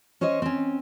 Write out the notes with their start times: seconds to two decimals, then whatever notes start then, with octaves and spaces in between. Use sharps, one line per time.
0.21 C#4 C5 C#5 D#5
0.42 C4 C#4